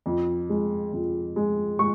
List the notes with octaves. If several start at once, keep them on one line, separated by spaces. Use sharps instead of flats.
F2
G#3
F2
G#3
G#3 C#6